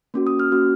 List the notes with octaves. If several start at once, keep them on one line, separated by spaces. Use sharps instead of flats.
A#3 C#4 F#4
D#6
F6
A#3 C#4 F#4